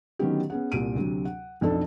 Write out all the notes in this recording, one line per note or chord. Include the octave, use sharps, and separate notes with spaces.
D3 D#3 F#3 B3 C#4 G4
B3 C#4 G#4 F#5
C2 A#2 D7 D#7
D2 C3 F#3
F#5
B1 F2 D4 A4 A5